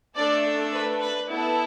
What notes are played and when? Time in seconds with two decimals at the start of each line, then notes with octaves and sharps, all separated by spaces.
0.16 A3 D4 A4 D5
0.72 B4
1.01 B4
1.28 B3 E4 A4